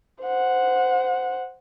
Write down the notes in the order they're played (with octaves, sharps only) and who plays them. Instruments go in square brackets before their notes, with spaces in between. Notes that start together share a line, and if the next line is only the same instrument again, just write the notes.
[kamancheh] C5 F#5